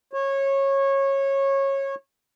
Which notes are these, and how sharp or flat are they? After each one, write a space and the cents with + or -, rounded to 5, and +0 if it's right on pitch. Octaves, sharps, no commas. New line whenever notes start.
C#5 -20